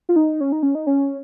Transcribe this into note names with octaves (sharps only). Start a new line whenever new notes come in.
F4
D#4
C#4
D#4
C#4
D#4
C#4